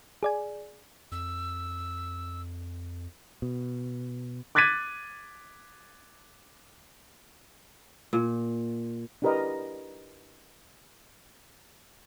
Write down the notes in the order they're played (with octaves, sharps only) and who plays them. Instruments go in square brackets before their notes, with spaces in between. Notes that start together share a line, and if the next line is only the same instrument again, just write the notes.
[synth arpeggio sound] G#4 D5 G#5
[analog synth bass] F2 [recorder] E6
[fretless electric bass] B2
[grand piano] D6 F#6 G#6 A6 B6 D#7
[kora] A#2
[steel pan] D4 E4 G4 A#4 B4 D#5